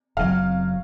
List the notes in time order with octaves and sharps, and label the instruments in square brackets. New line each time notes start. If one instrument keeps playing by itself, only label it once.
[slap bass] F#1 C#3 F#3 [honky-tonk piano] F5